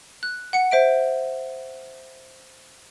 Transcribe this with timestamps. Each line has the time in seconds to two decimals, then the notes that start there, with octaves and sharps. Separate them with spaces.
0.23 F#6
0.53 F#5 C#7
0.71 C5 E5 D7